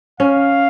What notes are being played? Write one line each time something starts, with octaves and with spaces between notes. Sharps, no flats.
C#4 F5